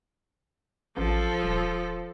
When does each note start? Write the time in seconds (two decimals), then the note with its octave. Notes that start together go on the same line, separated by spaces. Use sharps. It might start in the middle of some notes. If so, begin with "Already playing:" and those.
0.97 A1 F3 A4
1.43 D#1